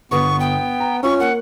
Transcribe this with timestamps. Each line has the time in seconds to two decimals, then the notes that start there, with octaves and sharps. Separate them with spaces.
0.11 G1 B3 B4 C#6 D#6
0.40 G5
0.80 A#5
1.03 C#4 F4 C#6
1.20 A#3 F#5